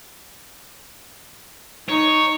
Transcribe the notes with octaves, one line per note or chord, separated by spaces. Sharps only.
D#4 C#5